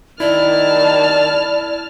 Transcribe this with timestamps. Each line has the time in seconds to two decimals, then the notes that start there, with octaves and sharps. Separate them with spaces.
0.20 D#3 E4 D5 A5 F6